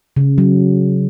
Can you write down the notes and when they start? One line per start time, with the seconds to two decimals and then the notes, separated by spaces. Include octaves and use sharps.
0.17 C#3
0.38 F#3